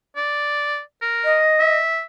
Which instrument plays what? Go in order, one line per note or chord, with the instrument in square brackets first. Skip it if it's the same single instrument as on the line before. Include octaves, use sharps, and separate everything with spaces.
[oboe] D5
A#4
[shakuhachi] D#5
[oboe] E5